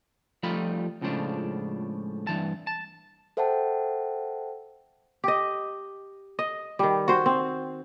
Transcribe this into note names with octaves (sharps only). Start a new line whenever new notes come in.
F3 G3 A3 D#4 F4 B5
C#2 A2 C#3 F3 D4
G2 E3 A5
A5
A4 C5 E5 F#5 G5 A5
G4 D#5
D#5
D#3 G3
F#4 C5
C4